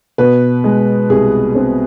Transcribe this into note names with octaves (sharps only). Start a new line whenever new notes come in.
B2 B4
G#3
C2 G#4
C4